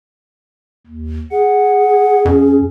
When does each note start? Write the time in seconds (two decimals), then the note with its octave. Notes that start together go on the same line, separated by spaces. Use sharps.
0.87 D#2
1.31 G#4 F#5
2.25 F2 C#4